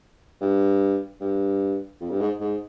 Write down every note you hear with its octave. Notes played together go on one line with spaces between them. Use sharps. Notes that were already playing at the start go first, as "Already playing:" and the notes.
G2
G2
F2
G2
G#2
G#2